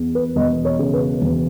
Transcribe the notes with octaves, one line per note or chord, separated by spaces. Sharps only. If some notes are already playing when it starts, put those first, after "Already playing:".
Already playing: E2
B4
E1 D#5
C#5
C#3
B4
E1